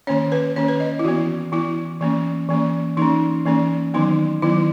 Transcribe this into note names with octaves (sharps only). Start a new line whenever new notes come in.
D#3 A#3 C#4 C#5
B4
D#3 A#3 C#4 C#5
B4
D#5
E4
E3 B3 F#4
E3 B3 E4
E3 A#3 C#4
E3 A#3 C#4
E3 A#3 C#4 D#4
E3 A#3 C#4
D#3 F#3 B3 D#4
D#3 F#3 B3 E4